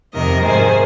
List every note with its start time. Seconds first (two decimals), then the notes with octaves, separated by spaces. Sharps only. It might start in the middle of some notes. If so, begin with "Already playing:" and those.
0.15 F2 C3 D#3 A#4 D#5
0.45 G#2 D#3 G#4 C5